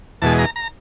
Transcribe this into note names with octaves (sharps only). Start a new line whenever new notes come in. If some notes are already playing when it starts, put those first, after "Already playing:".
E2 B2 G#3 A5
A#5
A#5